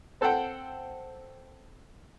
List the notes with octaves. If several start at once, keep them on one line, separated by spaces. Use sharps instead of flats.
C4 A4 C5 F#5 G5